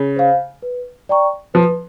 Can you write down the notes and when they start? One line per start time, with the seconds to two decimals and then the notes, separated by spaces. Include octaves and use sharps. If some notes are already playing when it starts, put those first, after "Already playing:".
Already playing: C#3
0.16 C5 F5
0.62 B4
1.09 D5 G5 A#5 C#6
1.54 F3 B4